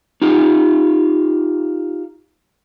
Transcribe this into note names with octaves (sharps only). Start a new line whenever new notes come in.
D#4 F4 G4